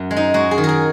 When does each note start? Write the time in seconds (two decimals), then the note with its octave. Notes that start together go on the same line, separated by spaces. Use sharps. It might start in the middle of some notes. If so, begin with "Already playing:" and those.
Already playing: F#2
0.11 G#3
0.16 D#4
0.34 G#3 F#4
0.51 G#4
0.58 D#3
0.64 A#4
0.69 G#4